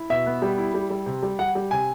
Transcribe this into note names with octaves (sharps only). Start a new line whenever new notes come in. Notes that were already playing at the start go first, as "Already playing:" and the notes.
Already playing: E4
B2 E5
B3
G3
E4
G3
G3
C3
G3
G3 F#5
G3
C3 G#5